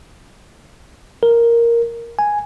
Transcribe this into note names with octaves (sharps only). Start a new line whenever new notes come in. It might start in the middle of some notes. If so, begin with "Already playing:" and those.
A#4
G#5